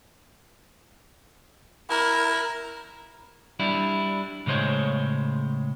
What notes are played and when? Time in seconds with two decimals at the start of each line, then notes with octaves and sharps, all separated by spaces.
1.90 E4 A#4
3.60 G3 D4 E4
4.46 A2 C#3 G#3 C5 C#5